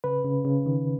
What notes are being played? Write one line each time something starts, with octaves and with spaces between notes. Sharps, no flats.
C#3 B4
C#3
C#3
D#3